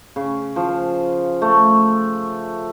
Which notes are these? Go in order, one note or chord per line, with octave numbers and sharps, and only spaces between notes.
C#3
F3
A3